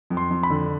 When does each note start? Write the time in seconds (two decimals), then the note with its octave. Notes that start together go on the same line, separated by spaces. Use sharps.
0.10 F2
0.17 C6
0.30 F2
0.43 B5
0.50 D3